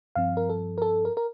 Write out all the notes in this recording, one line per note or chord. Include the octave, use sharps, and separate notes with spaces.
G2 F3 C4 F5
A#4
A4
A#4
A4
A#4
A#4